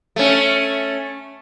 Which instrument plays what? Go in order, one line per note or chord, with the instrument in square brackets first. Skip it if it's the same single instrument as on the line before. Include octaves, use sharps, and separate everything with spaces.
[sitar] A3 C#4